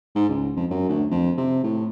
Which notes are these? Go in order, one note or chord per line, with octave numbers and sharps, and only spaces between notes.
G#2
C#2
F2
F#2
D2
F2
C3
A2